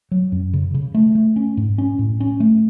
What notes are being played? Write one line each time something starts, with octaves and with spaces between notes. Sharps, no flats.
F#3
F#2
C#3
C#3
A3
A3
C#4
G#2
C#4
A2
C#4
A3